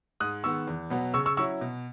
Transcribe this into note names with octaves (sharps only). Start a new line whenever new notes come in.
G#2 D#6 F#6
D#3 G#3 B3 C#6 E6
E2
B2 F#3 B3
C#3 C#6 E6
C#6 E6
F#3 C#4 E4 C#6 E6
B2